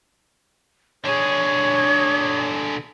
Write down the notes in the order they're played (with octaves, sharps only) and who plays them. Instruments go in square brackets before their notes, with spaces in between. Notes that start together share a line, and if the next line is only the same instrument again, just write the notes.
[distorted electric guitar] D3 G#4 [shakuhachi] C#5